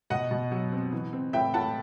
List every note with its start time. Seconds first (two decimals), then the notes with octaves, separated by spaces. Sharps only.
0.10 B2 D#5 F#5
0.31 B2
0.52 F#3
0.72 C4
0.92 E3
1.13 C4
1.33 A2 E5 G5
1.54 A2 F#5 A5